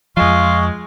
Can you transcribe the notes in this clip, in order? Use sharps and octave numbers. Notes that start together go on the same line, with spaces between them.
F2 F3 G#3 F4 C#6